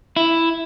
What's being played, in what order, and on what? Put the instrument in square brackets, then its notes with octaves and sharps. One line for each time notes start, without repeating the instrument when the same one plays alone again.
[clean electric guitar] E4